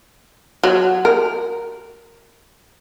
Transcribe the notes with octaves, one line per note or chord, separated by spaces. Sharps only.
F#3
A#4